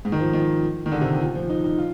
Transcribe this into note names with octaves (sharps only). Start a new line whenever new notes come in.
G#2
D#3
F3
D#3
D#3
D3
C3
A#2
F3
D#4
D#4
F4